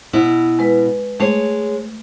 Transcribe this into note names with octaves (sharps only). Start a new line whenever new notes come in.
B2 E4
G#3 B4
G#3 A3 C#5